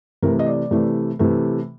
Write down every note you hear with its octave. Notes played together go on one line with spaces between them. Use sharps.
C3 E3 A3 A#4
D#5
D5
C3 E3 A3
C3 E3 A3